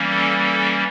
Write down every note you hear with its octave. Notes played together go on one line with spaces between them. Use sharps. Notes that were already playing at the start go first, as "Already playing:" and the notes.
Already playing: E3 G3 A#3 C#4
A4
A4